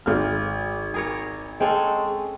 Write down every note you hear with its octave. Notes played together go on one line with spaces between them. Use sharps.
G#1 F6
G#4 A#4 C#5
G#3 C4 C#4 A4